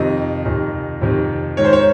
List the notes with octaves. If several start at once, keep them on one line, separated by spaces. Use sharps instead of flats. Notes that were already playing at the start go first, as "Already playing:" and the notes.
Already playing: F2 C3 D#3 D#5
F2 C3 D#3
F2 C3 D#3
G#2 D#3 C#5
C5
C#5